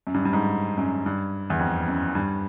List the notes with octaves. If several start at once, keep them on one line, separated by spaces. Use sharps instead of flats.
F#2
G2
G2
G#2
F#2
G2
E2
F2
F#2
G2